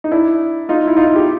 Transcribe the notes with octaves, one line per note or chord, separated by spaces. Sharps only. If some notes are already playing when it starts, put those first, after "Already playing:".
D#4
D4 E4
D#4 F4
E4
D#4 F4
G4